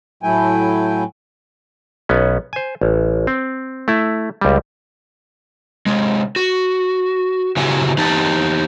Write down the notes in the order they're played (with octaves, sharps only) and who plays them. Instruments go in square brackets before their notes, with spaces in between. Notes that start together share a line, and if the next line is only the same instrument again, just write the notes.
[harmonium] A2 F#3 A3 E4 G5 G#5
[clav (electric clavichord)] B1 B3 C#4
C5 G#5
A1
C4
A3 E4
C#2 G3
[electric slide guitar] C3 G#3
F#4
C#3 E4 F#4 G4 E5 G#5
E3 D#4 G4 A5